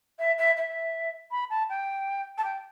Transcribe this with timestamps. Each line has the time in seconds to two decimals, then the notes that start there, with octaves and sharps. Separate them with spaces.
0.19 E5
0.38 E5
0.56 E5
1.31 B5
1.50 A5
1.69 G5
2.37 A5
2.44 G5